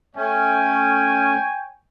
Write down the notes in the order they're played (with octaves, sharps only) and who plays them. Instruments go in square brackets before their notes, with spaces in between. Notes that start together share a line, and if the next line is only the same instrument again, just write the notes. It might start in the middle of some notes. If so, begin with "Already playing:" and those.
[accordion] A3 C#4 [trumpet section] C#5 G5 G#5